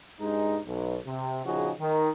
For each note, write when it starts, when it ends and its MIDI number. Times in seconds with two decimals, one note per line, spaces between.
0.21 0.59 43
0.21 0.59 56
0.21 0.59 63
0.66 0.98 35
1.06 1.42 48
1.45 1.71 34
1.45 1.71 49
1.45 1.71 53
1.45 1.71 63
1.45 1.71 66
1.45 1.71 68
1.79 2.10 51